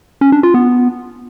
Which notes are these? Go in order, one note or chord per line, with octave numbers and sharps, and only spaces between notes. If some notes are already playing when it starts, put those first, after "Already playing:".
C#4
D4
F4
B3